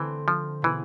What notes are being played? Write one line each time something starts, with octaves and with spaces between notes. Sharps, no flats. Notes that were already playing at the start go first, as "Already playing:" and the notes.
Already playing: D3 E3 A3 C4
F3
B2 E3 B3 E4 G#4